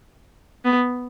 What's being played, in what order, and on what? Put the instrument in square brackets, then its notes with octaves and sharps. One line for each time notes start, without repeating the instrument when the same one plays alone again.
[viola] B3